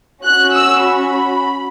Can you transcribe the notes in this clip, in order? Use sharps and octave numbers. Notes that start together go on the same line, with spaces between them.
C#4 F#4 F#6
E6
B5